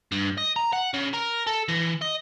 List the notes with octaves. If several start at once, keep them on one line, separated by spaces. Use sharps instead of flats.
G2
D#5
A#5
F#5
C#3
A#4
A4
E3
D#5